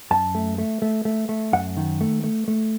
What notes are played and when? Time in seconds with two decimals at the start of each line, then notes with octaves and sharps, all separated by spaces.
0.11 F#2 A5
0.35 A3
0.58 A3
0.82 A3
1.05 A3
1.29 A3
1.53 F#2 F#5
1.77 D#3
2.01 A3
2.24 A3
2.48 A3